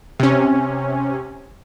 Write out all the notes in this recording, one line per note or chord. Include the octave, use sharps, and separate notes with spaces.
C3 C#4